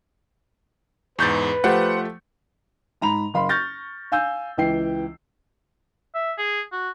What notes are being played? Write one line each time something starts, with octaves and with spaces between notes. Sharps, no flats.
E2 G#2 B4 C#6 G6 A6
F3 A3 G4 C5 F#5
G#2 A#5 B5 F7
F#1 F5 B5 C6
C#6 F6 G6 A6 A#6
F5 G#5 E6 G6
C#2 E3 G5 C7
E5
G#4
F#4